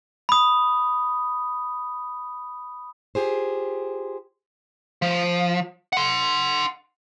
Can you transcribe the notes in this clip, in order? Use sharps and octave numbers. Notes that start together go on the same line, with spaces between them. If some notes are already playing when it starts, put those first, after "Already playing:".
B5 D#6
F4 G4 G#4 C5
F3
F#5 C6